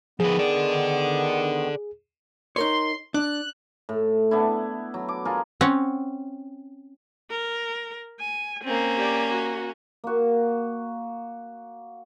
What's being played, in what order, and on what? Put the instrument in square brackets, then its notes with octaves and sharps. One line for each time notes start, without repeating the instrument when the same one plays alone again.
[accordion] D#3 B3 [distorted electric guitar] F3 B4 [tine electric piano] G#4
[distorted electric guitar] A4 D5
[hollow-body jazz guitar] D#4 A#4 C#5 [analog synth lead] C6
[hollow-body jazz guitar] D4 [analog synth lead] F#6
[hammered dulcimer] A2
B3 D4 E4
F#3
D6
F4 G#4 A#4
[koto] C4 C#4 F#5
[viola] A#4
G#5
[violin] A#3 C#4 [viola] C4
[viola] G4 D5
F#4
[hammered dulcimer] A#3 F#4